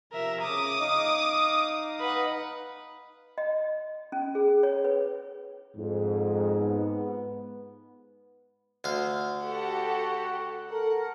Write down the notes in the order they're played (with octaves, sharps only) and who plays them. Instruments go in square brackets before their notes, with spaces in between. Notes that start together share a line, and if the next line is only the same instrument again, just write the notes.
[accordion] C3 F3 [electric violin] A#4 E5
[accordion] C#3 [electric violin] D6 D#6
[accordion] D#4 D#5 F5
[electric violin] B4 F#5
[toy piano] D#5
C#4
G#4
C#5
B4
[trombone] F2 [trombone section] G#2
[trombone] B3
[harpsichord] D2 F5
[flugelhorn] F#4 [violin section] G4 A4 F#5
[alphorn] A4 [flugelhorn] A#4 [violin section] F#5